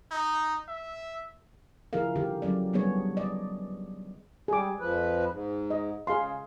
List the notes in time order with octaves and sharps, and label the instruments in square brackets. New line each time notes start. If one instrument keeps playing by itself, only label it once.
[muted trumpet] D#4
E5
[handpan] C#3 F3 E4 G#4 A#4 F5
D3 G4
F#3 C#4 D5
F#3 G3 B3 D4 G#4 C#5
D5 D#5
[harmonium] G3 [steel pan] G#4 D6
[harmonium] F2 F3 B4
G#2
[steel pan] D#5
[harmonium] C#3 [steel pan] G#4 F5 C6